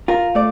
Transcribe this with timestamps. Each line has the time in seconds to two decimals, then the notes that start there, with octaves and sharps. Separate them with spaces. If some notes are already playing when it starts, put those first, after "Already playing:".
0.08 F4 A#4
0.35 A3 D5